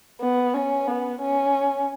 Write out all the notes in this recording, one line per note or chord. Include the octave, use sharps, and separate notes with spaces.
B3
C#4
B3
C#4